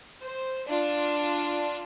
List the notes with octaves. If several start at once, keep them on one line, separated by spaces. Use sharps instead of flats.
C5
D4 F4